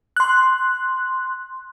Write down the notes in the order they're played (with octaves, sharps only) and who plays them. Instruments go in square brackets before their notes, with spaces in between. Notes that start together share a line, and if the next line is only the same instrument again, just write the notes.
[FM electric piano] C6 F#6